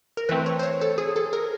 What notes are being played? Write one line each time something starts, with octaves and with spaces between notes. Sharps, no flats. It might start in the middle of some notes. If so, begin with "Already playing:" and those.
A#4
E3 A3 C4 B4
C#5
C5
C#5
A4
G#4
A4
A#4